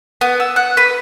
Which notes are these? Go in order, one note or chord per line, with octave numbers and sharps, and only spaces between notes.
B3
E6
F#5
B4